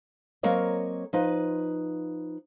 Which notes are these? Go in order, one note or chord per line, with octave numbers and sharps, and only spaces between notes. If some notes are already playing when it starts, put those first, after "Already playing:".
F#3 A#3 C4 A#4 C#5 D#5
F3 D#4 B4